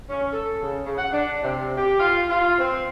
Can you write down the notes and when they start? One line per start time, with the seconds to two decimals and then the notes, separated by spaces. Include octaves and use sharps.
0.10 C#4
0.33 A4
0.62 C#3
0.85 C#3
0.98 F#5
1.12 D4
1.43 C3
1.78 G4
2.00 F4
2.30 F4
2.59 C4